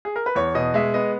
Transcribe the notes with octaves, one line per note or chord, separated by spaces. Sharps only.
G#4
A#4
B4
E2 C#5
B2 D#5
G#3 E5
B3 D#5